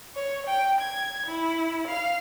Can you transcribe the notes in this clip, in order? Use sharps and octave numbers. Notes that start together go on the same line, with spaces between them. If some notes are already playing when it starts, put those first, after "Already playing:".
C#5
G5
G#6
E4
F5